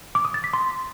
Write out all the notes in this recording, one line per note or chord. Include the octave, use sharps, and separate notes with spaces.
D6
D#6
A6
B6
C6